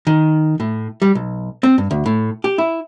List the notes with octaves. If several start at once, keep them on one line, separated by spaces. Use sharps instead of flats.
D#3
A2
G3
B1
C4
G2
D2
A2
G4
E4